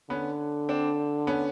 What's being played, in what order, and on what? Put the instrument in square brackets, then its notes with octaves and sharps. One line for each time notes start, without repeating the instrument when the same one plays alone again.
[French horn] D3 [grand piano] B3 C#4
[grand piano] C4 D4
B3 C#4